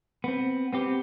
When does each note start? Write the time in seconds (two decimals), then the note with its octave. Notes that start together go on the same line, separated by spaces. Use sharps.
0.24 B3 C4
0.73 B3 C4 G4